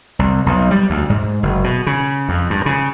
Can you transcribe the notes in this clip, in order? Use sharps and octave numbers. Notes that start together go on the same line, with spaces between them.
C2
B1
G3
D2
G#2
F#1
B2
C#3
F2
G2
C#3